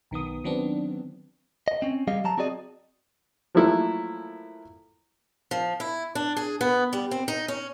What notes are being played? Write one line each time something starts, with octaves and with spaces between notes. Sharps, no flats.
B1 D#3 B3 D#6
D#3 F#3 B3 C4 D4
D#5
C4 C#4
G3 G4 G#4 D#5 F5
F#3 A5 A#5
C4 F#4 G#4 D5 D#5
F3 F#3 A3 A#3 E4 A4
F3
E4
D4
G#4
B3
G3
C4
D#4
C#4